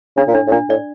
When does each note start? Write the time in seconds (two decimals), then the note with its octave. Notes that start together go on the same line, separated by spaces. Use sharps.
0.17 C#3 D4
0.28 A#2
0.35 A2 D4
0.47 A2
0.52 A#2 D4
0.70 A2 D5